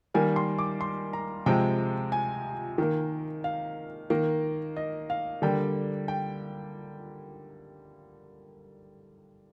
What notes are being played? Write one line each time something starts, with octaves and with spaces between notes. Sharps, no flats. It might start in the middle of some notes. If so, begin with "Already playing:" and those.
D#3 G3 A#3 G#5
C6
D6
C6
A#5
C3 F3 G#3 C4 G5
G#5
D#3 A#3
F5
D#3 A#3
D#5
F5
D3 G3 A#3 G5
G5